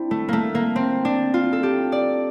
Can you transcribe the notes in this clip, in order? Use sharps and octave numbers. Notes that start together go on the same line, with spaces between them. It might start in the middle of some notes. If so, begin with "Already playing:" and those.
Already playing: C4 D4 E4
A3
A3 A#3
A#3
C4
D4
F4
A4
G4
D5